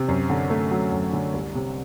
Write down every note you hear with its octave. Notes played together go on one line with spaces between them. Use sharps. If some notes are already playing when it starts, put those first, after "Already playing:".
Already playing: C3
F#2
D3
A3
F#3
F#2
D3
C2
C3